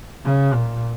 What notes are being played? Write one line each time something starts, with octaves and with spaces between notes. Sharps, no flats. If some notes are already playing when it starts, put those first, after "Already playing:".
C#3
A#2